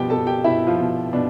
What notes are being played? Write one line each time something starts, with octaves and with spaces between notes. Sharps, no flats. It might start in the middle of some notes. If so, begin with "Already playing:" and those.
Already playing: B2 F3 G3 G4 G5
B2 A4 A5
G4 G5
B2 E4 E5
F3 F4
B2
B2 D4